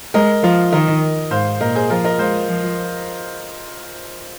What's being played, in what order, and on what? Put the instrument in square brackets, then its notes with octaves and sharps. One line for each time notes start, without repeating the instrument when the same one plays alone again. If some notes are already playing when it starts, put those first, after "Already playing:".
[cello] G#3 [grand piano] A#4 D#5
[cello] F3 [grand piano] F4 A#4
[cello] D#3 [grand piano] A#4 D#5
[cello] G#2 [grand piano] C5 F5
[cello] A#2 [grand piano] A#4 D#5
[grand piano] G#4 C5
[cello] F3 [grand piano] F4 A#4
[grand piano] A#4 D#5
[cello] G#3 [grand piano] C5 F5
[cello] F3